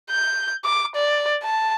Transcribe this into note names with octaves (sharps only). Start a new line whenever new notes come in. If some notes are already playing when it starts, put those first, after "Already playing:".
G6
D6
D5
A5